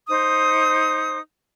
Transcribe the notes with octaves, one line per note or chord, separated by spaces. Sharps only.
D#4 C5 D#6